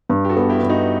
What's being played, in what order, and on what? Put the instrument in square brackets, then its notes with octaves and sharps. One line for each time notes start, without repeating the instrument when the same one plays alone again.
[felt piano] G2
[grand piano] G4
F#4 A4
[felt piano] B3
[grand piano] E4 G4
[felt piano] G2
[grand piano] D#4 F#4